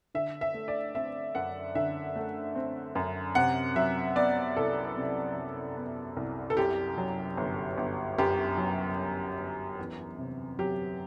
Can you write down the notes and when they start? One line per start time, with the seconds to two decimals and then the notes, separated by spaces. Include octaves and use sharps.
0.14 D3 E5
0.41 E5
0.54 A3
0.68 D5
0.95 C4 E5
1.35 F#2 F#5
1.75 D3 E5
2.16 A3
2.55 C4
2.95 F#2
3.35 C3 F#5
3.76 F#3 E5
4.16 B3 D5
4.57 C2 A4
4.97 C3
5.37 F#3
5.77 B3
6.17 C2
6.50 A4
6.57 F#2 G4
6.98 F#3
7.37 G1
7.77 G1
8.18 F#2 G4
8.58 F#3
8.98 G1
9.38 G1
9.79 E2
10.18 C3
10.59 F#3 G4